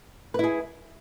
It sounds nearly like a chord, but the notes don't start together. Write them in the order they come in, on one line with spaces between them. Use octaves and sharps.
B4 E4 G#4